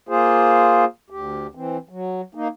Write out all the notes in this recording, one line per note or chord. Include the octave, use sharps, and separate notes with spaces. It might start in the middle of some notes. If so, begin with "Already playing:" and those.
A#3 F4 G#4 C5
D2 G4
E3 C4
F#3
A#3 D#4